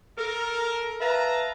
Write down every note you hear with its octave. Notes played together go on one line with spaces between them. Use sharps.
A4 A#4
B4 E5 F5 A5 A#5